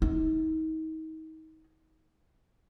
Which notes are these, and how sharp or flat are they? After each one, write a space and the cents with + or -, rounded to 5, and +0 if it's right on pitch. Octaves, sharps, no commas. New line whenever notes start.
D#4 +35